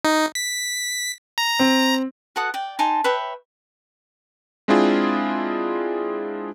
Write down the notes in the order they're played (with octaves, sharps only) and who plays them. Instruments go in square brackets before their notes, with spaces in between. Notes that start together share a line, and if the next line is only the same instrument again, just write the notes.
[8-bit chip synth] D#4
B6
A#5
[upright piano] C4
[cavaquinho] F#4 A4 F#5 D#6
D5 G5
D#4 G#5 A5 C6
B4 C#5 E5 G5
[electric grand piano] G#3 C4 D4 E4 F4 G#4